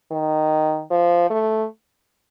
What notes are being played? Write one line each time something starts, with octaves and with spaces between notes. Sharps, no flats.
D#3
F3
A3